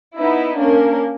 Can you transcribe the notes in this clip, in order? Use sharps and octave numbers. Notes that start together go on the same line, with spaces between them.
B3 D#4 E4
A#3 C#4 D4 A#4